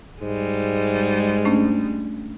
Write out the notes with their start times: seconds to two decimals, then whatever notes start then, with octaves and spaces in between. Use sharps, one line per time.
0.22 G#2 G3 G#3
1.45 A3 C#4 D4